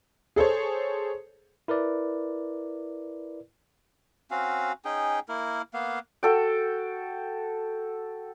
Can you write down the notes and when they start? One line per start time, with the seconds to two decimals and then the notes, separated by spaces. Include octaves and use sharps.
0.36 G#4 A4 C5 C#5
1.68 E4 A#4 B4 D5
4.31 C4 C#4 F#4 F5
4.85 C#4 D#4 G#4 G5
5.29 A#3 E4 A#4
5.74 A#3 B3 F5
6.23 F#4 A4 G5